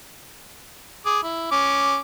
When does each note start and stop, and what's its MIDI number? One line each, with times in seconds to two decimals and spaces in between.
1.06 1.19 68
1.06 1.19 86
1.23 1.48 64
1.52 1.98 61
1.52 1.98 86